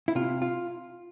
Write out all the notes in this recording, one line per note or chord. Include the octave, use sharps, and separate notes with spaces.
E4
C3 F4
F4